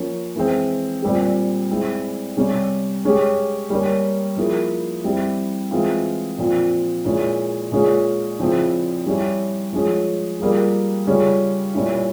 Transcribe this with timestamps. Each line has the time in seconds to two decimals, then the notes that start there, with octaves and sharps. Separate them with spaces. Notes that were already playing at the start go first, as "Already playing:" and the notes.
Already playing: F3 A#3 C#4
0.36 E3 G#3 C4
1.02 A#2 G3 C4 G4
1.70 G#3 C4 E4
2.37 C3 G3 C#4 G4
3.04 G#3 C#4 G4
3.70 G3 A#3 C#4
4.37 F3 A#3 E4 G#4
5.04 G3 C4 E4 G4
5.71 E3 G#3 C4 F4
6.38 A#2 F3 C4 F4
7.05 A#2 G#3 C#4 E4 G#4
7.72 A#2 G#3 C#4 F4 G#4
8.39 C#3 F3 C4 E4
9.06 G3 C#4 E4 G4
9.73 F3 G#3 C#4
10.40 G3 A#3 F4 G#4
11.07 C#3 G3 C#4 F4
11.74 A#2 G3 C#4 E4